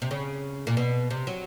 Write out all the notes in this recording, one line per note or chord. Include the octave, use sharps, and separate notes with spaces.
C3
C#3
A#2
B2
C3
F#3